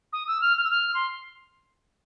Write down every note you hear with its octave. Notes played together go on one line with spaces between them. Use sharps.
D#6
E6
F6
F6
E6
F6
C6